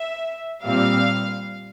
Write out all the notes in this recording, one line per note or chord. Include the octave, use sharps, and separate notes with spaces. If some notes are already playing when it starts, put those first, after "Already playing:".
Already playing: E5
A#2 G3 C4 F5